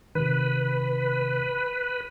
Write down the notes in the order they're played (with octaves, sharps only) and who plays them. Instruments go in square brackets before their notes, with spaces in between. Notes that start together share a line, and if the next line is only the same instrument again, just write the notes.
[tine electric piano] C3 D#3 [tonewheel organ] B4